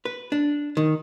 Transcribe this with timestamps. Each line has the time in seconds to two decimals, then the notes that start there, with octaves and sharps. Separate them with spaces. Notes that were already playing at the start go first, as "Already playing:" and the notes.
0.05 B4
0.32 D4
0.77 D#3